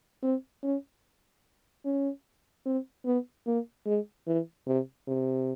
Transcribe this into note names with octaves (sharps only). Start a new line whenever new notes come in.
C4
C#4
C#4
C4
B3
A#3
G#3
E3
C3
C3